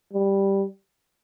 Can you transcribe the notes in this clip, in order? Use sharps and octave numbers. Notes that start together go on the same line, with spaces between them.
G3